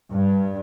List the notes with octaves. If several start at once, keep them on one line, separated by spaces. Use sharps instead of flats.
G2